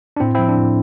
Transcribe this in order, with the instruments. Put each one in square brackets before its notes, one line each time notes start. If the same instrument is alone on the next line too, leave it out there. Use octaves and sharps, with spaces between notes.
[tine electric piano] D4
A2 C4 E4
F3 C4 E4
D4
A2